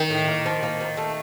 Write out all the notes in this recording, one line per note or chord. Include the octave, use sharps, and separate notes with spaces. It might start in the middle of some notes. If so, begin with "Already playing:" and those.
Already playing: D#3
A2
A#3
F3
A#3
F3
A3